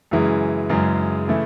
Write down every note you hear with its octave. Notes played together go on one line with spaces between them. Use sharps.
F#2 C#3 E3 G#3
F#2 C#3 E3 G#3
C#3 E3 A3 E4